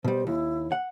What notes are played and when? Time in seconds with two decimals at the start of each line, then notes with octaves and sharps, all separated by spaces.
0.05 B2 G3 C5
0.27 D#2 E4
0.72 F#5